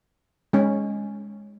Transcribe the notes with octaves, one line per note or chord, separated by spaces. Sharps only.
G#3 C#4